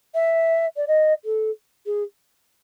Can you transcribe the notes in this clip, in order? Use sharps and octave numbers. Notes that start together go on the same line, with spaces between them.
E5
D5
D#5
A4
G#4